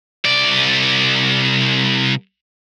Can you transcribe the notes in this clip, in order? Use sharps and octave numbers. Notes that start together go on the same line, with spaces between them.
C2 D5